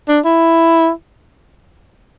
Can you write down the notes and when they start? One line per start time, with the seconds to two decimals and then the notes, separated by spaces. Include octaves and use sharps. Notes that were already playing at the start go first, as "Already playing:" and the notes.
0.09 D4
0.25 E4